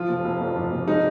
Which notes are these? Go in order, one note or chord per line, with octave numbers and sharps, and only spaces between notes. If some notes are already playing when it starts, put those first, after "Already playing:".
Already playing: F3 F4
F1
F1
F2
F3
F1
G#3 D#4